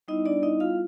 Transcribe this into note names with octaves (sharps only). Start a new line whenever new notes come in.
G3 B3 D#4 E4 D#5
D4 D5
D#4 D#5
F4 F5